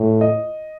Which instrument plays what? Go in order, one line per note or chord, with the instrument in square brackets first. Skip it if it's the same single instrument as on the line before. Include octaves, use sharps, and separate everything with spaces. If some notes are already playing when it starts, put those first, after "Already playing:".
Already playing: [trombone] A2
[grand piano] D#5